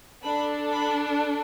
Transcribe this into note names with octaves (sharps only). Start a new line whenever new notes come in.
D4 A4 B5
B5